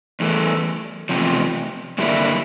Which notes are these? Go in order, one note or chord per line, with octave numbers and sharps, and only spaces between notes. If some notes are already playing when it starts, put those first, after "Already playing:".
E2 E3 A3
E2 C3 F3
G2 D3 G3 A#3 E4